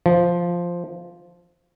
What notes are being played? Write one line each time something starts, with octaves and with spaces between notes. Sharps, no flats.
F3